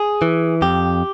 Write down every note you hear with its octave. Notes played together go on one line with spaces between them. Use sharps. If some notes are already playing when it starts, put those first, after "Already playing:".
Already playing: G#4
E3
F2 G4